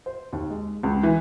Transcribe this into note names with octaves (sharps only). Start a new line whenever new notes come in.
C5
D#2
G#3
C#2
E3